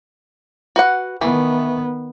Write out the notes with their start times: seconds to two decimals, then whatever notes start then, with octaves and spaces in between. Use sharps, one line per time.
0.76 F#4 B4 F#5
1.21 D#3 E3 A3 B3